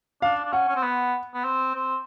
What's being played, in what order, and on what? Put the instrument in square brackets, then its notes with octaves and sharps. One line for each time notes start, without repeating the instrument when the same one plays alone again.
[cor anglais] D4 [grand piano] F5
[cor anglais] D4
[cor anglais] C#4 [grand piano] F#5
[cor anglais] C#4
C4
B3
B3
C4
C4